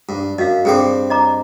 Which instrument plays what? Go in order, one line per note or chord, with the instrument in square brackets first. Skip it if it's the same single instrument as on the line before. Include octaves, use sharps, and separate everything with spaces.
[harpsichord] G2
[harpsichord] F#2 [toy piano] D#5 F5
[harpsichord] G2 C4 D5 [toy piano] G#4 A4 G5
[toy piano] D#5 A#5 D6